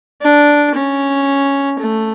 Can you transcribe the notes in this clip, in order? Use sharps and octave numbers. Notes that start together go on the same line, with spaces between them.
D4
C#4
A3